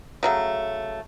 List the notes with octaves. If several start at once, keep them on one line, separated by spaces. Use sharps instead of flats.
C#3 F#3 A3